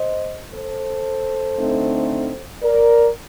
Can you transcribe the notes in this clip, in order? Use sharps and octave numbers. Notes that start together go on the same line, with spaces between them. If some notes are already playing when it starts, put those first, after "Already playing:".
Already playing: C5 D#5
A4 C5
D3 A3 C4 D#4
A#4 D5